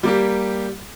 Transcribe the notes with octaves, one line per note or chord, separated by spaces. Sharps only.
G3 A#3 G4